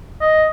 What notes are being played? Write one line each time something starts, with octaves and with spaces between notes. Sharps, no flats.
D#5